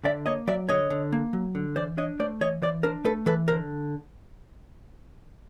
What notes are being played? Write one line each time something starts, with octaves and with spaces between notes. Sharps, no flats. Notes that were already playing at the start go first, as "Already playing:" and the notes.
D3 D5 E5
A#3 C#5 D#5
F#3 D5 E5
D3 C#5 D#5
D3
A#3
F#3
D3
E3 C5 D5
D4 C#5 D#5
A3 C5 D5
E3 C#5 D#5
E3 C5 D5
D4 A#4 C5
A3 A4 B4
E3 A4 B4
D3 A#4 C5